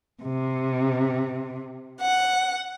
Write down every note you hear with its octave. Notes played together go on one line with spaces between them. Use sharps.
C3
F#5